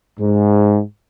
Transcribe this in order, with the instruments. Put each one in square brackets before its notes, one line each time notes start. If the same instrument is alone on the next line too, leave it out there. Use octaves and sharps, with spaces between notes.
[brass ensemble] G#2